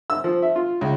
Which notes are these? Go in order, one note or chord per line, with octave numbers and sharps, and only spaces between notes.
E6
F3
E5
F4
C#2